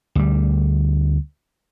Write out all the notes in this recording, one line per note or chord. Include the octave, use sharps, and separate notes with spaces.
D2 G3